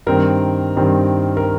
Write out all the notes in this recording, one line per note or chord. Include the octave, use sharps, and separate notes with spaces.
G2 D#3 C4 A#4
G2 D#3 C4
A#4